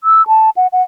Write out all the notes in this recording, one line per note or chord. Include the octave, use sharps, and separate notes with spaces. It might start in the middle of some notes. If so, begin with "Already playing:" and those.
E6
A5
F#5
F#5